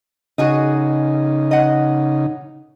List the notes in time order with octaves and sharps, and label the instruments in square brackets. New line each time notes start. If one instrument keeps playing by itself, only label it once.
[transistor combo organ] C#3 D#4 [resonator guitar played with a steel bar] F#4 G#4 D#5
[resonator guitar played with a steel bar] D#5 F#5